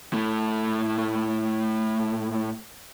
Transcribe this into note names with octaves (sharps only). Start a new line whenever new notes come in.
A2 A3